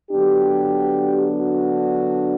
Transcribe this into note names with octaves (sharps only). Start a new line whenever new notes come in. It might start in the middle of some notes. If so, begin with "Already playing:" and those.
D3 F#3 B3 D4 G4
F#4